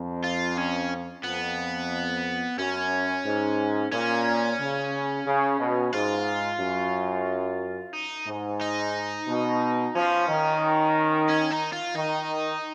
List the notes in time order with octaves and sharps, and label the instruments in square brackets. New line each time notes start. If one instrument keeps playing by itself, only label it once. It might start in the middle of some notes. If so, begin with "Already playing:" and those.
Already playing: [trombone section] F2
[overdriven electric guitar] F4
C#4
[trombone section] F2 [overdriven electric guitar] B3
[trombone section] F#2 [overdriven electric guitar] C#4
[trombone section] G#2
[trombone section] A#2 [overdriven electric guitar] C#4
[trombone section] C#3
C#3
B2
[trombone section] G#2 [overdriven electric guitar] F4
[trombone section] F#2
[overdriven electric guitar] D#4
[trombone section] G#2
[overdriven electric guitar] D#4
[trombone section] B2
[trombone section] F3 [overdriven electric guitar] C#4
[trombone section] D#3
[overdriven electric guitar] C#4
D#4
F4
[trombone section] D#3 [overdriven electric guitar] D#4